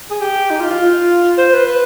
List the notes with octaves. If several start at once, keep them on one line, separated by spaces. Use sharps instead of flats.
G#4
G4
D#4
F4
F4
C5
B4
B4